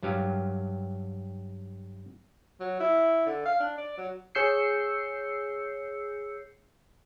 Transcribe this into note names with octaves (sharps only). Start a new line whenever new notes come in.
G2 F#3 G4 F5
F#3
E4
D3
F5
D4
D5
F#3
G#4 C#5 E6 G6 C7 C#7